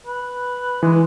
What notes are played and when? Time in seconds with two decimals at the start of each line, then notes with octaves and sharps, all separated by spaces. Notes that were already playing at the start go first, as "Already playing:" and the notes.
0.07 B4
0.83 E3 G#3